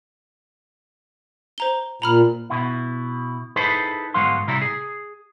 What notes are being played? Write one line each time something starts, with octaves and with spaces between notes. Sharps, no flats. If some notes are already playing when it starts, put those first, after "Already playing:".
C5 A#5 G7
A#2 A#5 B5 F6
B2 E4
D#4 E4 G#4 A4 B4 C5
G#2 D3 F#3 B3 F5 C6
A2 C3 G3 E4 A#5
G#4